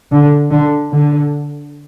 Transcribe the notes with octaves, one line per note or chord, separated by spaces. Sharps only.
D3
D3
D3